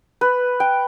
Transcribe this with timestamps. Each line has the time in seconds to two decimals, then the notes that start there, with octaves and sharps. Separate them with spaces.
0.21 B4
0.60 G5